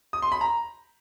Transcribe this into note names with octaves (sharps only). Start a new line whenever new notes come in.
D#6
C6
B5
A#5